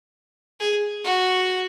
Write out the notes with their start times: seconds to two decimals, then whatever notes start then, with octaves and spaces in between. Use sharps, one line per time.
0.60 G#4
1.04 F#4